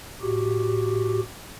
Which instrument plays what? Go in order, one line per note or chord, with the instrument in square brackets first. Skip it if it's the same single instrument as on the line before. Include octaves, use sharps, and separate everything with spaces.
[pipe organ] A2 F#4 G4